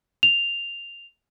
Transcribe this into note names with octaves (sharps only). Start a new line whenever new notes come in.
F7